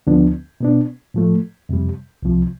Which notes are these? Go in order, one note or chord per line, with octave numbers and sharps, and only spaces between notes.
D2 D3 F3 B3 D4
B2 B3 D4
A2 F3 A3
F2 C3 G3
C2 C3 F3